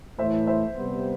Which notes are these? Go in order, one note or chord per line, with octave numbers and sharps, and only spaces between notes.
A2 E3 A3 E4 C5 E5
C5 E5
C3 G3 B3